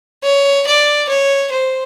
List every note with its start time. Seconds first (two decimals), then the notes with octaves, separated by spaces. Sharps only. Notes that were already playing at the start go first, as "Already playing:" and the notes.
0.23 C#5
0.66 D5
1.09 C#5
1.52 C5